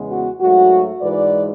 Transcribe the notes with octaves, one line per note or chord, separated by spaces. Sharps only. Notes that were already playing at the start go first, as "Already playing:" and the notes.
Already playing: E2 C#3 G#3 B3
F#4
G#2 F#3 A3 F#4
G#2 E3 G#3 B4 D5